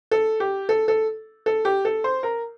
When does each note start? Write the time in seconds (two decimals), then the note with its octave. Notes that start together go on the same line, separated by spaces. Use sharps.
0.11 A4
0.40 G4
0.69 A4
0.88 A4
1.46 A4
1.65 G4
1.85 A4
2.04 C5
2.23 A#4